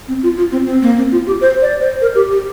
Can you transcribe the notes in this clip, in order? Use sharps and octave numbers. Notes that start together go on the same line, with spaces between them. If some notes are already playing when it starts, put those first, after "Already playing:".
C4
F4
F4
C4
C4
A#3
C4
F4
G4
C5
D5
C5
A#4
G4
G4